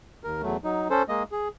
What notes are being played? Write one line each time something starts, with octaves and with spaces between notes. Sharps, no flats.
D#2 A#4
E2 F#3 A3
F#3 D#4
C#4 A4 C5
G#3 A#3 D#5
G#4